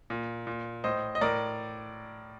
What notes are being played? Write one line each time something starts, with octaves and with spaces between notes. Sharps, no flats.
A#2
A#2
A2 C5 D#5
D#5
A2 A#4 D5